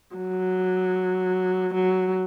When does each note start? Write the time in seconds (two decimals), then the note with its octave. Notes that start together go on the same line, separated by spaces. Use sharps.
0.16 F#3
1.74 F#3